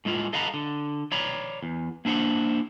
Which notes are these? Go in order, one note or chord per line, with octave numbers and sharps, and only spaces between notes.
A2 G#3 E4 F4
A4 D#5 F5 F#5 A#5 B5
D3
C#5 D5 A#5 B5
E2
A#3 D4 E4 C5 F#5